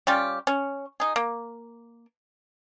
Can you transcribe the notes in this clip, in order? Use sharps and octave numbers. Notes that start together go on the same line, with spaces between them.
G3 C#4 F4 G4
C#4
D#4 G#4
A#3